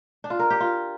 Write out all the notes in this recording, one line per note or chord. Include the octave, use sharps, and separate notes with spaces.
D4
F4
A#4
G4
F4